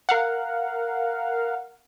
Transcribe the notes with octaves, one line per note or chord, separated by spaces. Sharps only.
A#4 F5 F#5